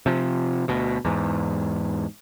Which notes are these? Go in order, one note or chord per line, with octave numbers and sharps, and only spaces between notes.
C3 F3
D2 B2
E2 G#2